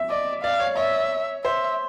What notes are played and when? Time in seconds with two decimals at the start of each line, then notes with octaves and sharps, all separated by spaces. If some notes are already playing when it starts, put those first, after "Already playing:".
Already playing: E5
0.10 D5 D#5
0.43 D5 F5
0.60 C#5
0.77 C#5 E5
1.44 C5 E5